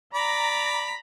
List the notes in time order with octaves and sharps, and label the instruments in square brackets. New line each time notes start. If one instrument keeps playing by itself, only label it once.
[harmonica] D5 B5 [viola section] A#5